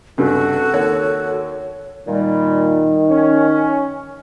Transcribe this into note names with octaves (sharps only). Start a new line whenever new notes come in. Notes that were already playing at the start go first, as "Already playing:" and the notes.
C#2 G2 C3 F#4 A4
D#2 C#5 F#5
A#2 D#3 G3
C#4